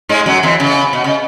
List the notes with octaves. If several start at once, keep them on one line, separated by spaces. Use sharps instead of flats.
G#2 G#3
F#2 F#3
E2 E3
C#3
B2
C#3